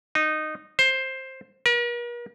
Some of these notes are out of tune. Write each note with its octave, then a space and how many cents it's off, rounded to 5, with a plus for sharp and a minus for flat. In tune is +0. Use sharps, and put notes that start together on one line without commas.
D#4 -15
C5 +10
A#4 +45